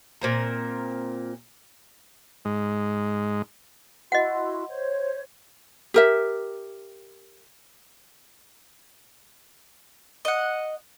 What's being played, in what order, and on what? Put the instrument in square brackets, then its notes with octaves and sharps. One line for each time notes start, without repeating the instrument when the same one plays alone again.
[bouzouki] A#2 C4 A#4
[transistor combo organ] G#2 G#3
[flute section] E4 F#4 C6 [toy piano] D#5 F#5
[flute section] C5 C#5
[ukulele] G4 A#4 E5
[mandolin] D#5 F#5